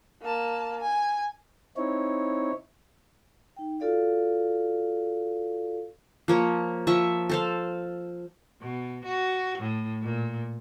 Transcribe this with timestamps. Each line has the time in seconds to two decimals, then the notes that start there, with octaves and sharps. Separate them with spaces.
0.22 A#3 A5
0.80 G#5
1.77 C4 D#4 E4 C#5
3.57 D#4 G5
3.80 F4 F#4 A4 D5 F5
6.28 F3 A#3 C#5
6.87 F3 E5 C#6
7.30 A4 C5 F5
8.61 B2
9.05 F#4
9.59 A2
10.03 A#2